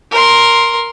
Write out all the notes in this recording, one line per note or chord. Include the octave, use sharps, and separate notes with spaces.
A#4 C6